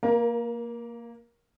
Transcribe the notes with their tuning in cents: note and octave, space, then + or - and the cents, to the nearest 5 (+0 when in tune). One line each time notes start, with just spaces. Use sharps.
A#3 -5 A#4 +25